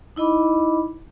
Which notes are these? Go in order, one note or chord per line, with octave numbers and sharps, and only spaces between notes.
D#4 E4 D#5 B5 D6